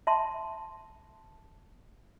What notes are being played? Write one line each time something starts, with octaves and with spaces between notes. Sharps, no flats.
E5 A5 C6